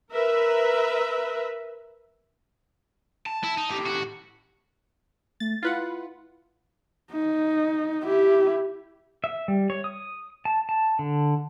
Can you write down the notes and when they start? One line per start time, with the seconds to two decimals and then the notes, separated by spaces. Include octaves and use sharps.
0.13 A#4 B4 E5
3.26 A5
3.44 E4
3.58 D#4
3.70 A2 G4
3.86 F#4
5.40 A3 A6
5.63 E4 F4 B4 F#5
7.12 D#4
8.04 E4 G4
9.24 E5
9.48 G3
9.70 C#5
9.84 D#6
10.45 A5
10.69 A5
10.99 D3